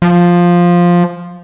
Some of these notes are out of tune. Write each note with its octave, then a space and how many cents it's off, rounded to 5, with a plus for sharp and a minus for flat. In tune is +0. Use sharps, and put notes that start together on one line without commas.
F3 +5